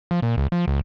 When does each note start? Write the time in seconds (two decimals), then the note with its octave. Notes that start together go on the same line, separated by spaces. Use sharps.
0.11 F3
0.23 A#2
0.38 C#2
0.52 F3
0.68 C#2